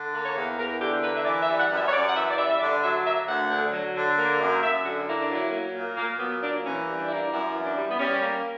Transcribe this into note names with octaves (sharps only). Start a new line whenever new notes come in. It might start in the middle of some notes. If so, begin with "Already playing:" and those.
Already playing: D3
A#3
C#5
E2
E2 A#4
D3 G4
A#3 B4
E5
E3 D5
E5
G3
F#5
F#2
E5
C#5
F#2 D5
F#5
E3 E5
D5
G3 E5
E5
D3 D5
F#3 E5
A#3 E5
D2 F#5
D3
F#3
D3
A#3
F#2
F#2 E5
D3 F#4
A#3 E4
D4
F#3 E4
A#3
A#2
A#2 A#3
F#3 B3
A#3 D4
E3 C#4
G3
D4
A#3 E4
D4
F#2 E4
E3
D4
G3
B3
G3 C#4
A#3